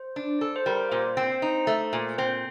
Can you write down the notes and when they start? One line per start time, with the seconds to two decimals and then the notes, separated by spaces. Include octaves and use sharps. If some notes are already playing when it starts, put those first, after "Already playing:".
Already playing: C5
0.16 D4
0.41 A4
0.56 C5
0.66 G3 A#4
0.91 A#2 C5
1.17 C4
1.42 D#4
1.67 A3
1.93 A#2
2.18 C4 C5